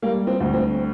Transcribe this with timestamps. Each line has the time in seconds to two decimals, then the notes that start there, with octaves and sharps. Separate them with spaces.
0.02 G3 A#3
0.27 C4
0.40 D2
0.53 C4